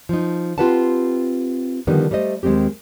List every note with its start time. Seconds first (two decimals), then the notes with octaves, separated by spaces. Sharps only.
0.09 F3 D#4
0.58 C4 F4 G4 B4 F#5 A5
1.87 D3 D#3 F3 G3 B3 D#4
2.11 G3 A3 C5 D#5
2.43 D#2 G#3 A3 C4 G4